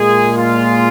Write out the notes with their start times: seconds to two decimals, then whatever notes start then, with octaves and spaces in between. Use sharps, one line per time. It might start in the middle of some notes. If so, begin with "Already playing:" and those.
Already playing: A#2 G#3 G#4
0.35 F4